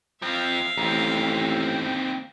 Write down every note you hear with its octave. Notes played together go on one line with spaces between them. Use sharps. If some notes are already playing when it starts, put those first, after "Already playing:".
F3 C4 E5 F5
A1 D#2 C4